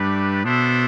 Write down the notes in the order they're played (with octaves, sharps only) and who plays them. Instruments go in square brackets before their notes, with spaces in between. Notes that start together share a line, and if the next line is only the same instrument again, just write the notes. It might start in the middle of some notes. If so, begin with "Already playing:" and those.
Already playing: [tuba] G2 [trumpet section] A3 D4 G4 B4 D5
[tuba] B2 [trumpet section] B3 D4 A4 C5 E5